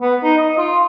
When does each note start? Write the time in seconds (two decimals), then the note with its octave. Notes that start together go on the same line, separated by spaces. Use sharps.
0.01 B3
0.23 D#4
0.38 D#5
0.58 F4